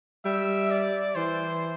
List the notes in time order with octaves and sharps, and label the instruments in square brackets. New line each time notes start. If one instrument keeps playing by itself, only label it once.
[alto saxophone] G3 [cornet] E5
[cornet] D5
[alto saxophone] E3 [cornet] C5